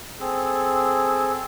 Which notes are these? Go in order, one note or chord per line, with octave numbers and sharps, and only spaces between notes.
C4 G#4 A4